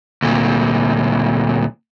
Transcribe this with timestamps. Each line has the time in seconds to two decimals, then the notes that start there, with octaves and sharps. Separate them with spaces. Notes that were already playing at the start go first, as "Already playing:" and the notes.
0.22 D2 A#2